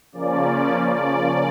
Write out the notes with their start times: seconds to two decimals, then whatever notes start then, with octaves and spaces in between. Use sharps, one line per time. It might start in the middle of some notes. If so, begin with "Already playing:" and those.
0.12 C#3 F3 A#3 C#4 D5
0.93 D5